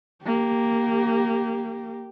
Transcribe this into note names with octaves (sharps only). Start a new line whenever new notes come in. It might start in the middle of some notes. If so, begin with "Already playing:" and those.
A#3 G4